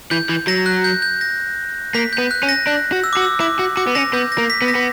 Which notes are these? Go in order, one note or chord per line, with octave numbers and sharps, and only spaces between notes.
E3 G6
E3
F#3 A#6
F#6
G6
G6
A#6
A#3 B6
G6
B3
F#6
C#4
A#6
D4 F#6
F#4
E6
F#4 D6
E6
E4 D6
F#4
F#4 D6
B3
C#4 A#6
B3 G6
A#6
A#3
B6
B3
A#6
B3